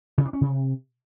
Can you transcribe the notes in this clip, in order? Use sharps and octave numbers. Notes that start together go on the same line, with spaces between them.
C3
D4
C#4
C3